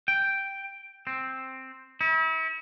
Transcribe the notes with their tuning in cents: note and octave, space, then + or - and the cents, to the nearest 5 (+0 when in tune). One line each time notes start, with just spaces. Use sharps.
G5 +0
C4 +5
E4 -40